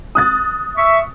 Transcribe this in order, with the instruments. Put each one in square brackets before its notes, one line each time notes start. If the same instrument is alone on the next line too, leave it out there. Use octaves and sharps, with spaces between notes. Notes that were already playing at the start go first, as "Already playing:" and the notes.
[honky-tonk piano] D#6 F#6 A6
[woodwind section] E5 C#6